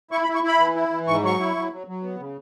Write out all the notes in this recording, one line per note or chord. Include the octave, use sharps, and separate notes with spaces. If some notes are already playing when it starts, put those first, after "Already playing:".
E4 C#6
B5
E4
C#6
E4 B5
E3
E4
E3
G#2 C#6
F#3 C#6
E4
F#3
F#3
F#3
B3
C#3